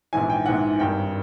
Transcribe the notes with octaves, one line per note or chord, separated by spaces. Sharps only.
A#1 G#2 E3 G#5
G5
A#1 G#2 E3 F#5
G#1 G2 D#3 G5